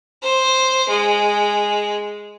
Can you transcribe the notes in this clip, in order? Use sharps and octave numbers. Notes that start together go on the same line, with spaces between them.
C5
G#3